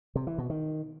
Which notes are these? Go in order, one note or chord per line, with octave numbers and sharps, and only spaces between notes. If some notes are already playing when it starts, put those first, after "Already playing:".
C3
E3
B2
D#3